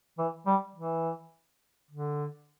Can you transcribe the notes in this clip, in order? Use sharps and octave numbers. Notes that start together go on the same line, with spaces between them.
E3
G3
E3
D3